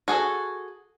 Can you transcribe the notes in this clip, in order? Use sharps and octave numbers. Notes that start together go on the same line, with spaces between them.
F#4 G#4 A4